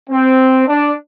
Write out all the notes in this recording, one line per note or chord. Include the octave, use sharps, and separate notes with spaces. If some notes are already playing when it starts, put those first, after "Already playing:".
C4
D4